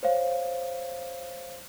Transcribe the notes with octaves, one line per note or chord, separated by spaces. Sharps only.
C5 C#5 F5